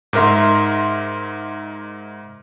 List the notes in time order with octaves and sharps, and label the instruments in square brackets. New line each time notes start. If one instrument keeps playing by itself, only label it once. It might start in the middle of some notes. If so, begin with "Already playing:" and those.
[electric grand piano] G#2 D#4 A#4 E5 C6